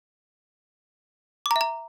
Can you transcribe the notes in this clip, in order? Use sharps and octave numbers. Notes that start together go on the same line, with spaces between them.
D6
A#5
E5
A#5